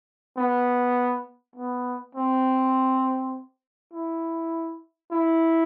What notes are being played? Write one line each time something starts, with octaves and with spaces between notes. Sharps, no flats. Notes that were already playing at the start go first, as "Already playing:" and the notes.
B3
B3
C4
E4
E4